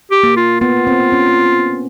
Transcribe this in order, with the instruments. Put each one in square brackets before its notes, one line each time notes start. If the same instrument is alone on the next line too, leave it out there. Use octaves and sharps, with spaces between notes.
[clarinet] G4
[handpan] A#3
[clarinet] F4
[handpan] B3 [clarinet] F4
[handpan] C4
C#4